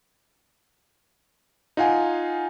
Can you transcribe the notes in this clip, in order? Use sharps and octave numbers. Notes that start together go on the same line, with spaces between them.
D#4 F4 F5 F#5 G#5